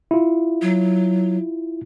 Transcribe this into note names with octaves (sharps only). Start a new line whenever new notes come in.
E4 F4
F#3